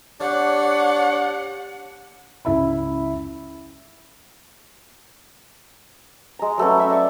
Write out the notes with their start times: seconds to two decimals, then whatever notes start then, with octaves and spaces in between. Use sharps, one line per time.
0.21 D4 G4 C#5 F#5
2.45 C#2 E4 E5 B5
6.39 G#3 A#5
6.58 F#3 A3 B3 C#4
6.77 D#5 E5 E6
6.90 D5 C#6